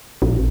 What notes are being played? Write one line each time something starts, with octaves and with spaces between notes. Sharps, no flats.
A#1